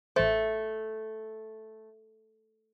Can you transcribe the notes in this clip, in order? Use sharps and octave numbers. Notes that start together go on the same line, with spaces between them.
A1 A3 C5